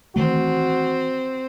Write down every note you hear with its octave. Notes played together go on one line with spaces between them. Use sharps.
D#3 E3 A3 C4 F#4